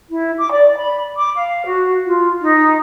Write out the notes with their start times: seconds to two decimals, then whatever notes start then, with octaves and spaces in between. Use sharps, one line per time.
0.11 E4
0.38 D6
0.51 D5
0.77 B5
1.17 D6
1.35 F5
1.65 F#4
2.06 F4
2.41 D#4